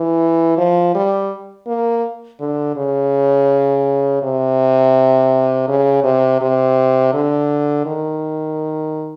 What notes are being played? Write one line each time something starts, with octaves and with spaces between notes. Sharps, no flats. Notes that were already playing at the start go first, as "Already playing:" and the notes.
Already playing: E3
F3
G3
A#3
D3
C#3
C3
C#3
C3
C3
D3
D#3